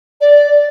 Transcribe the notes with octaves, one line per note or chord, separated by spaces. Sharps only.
D5